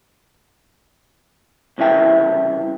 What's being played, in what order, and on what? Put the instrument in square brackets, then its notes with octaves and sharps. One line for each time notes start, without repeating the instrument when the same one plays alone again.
[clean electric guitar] C2 C#3 E3 E5 G5